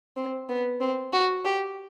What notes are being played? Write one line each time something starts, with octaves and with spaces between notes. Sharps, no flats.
C4
B3
C4
F#4
G4